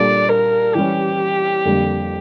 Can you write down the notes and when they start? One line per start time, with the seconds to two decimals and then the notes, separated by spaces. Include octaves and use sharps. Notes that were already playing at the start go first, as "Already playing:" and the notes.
Already playing: A#2 G3 D4 A4 D5
0.30 A#4
0.74 E3 G3 C#4 G4
1.65 F2 D3 G3 A#3